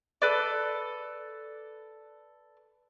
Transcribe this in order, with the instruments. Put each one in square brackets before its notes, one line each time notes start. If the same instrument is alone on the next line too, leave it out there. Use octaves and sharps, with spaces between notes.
[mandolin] A4 B4 D5